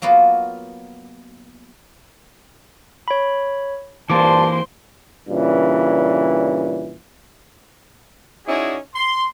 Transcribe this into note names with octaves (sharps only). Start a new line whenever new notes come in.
F#3 A#3 B3 F4 F#4
C#5 B5
G2 A#2 E3 A#3 C5 A5 C6 D6
G2 A#2 C#3 E3
C#4 D#4 E4 F#4 G#4 D5
C6